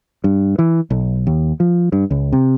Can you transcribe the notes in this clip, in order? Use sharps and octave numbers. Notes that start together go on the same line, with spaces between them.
G2
E3
B1
D#2
F3
G2
C#2
C3